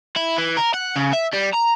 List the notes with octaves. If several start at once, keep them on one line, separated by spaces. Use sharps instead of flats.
E4
E3
A#4
F#5
C#3
E5
G3
A#5